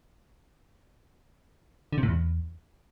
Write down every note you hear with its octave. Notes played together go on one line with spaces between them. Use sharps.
D3
C3
A2
E2